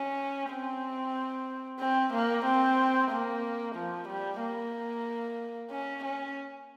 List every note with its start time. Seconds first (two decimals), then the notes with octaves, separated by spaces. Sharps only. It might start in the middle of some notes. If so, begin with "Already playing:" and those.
Already playing: C#4
0.50 C4
1.80 C4
2.13 A#3
2.45 C4
3.11 A#3
3.75 F3
4.08 G3
4.41 A#3
5.71 C#4
6.04 C#4